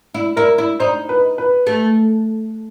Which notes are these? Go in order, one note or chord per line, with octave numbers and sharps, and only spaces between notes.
E4
E4 A#4
E4
D#4 C5
B4
B4
A3